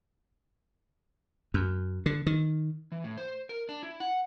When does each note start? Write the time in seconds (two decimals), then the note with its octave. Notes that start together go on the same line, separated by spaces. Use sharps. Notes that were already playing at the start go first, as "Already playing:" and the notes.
1.54 F#2
2.06 D3
2.26 D#3
2.92 E3
3.04 A2
3.18 C5
3.49 A#4
3.69 D4
3.83 E4
4.00 F#5